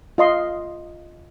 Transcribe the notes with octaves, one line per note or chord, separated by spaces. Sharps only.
F4 D#5 C6